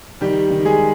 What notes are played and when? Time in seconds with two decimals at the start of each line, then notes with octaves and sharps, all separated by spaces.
0.21 D#3 G3 G4
0.51 D#3
0.65 G#3 G#4